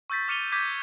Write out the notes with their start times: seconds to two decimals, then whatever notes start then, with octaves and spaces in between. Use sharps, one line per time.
0.10 C#6 E6 G6 A6 B6
0.28 D6 F6 C#7 D#7 F7 G7
0.52 D6 G6 G#6 B6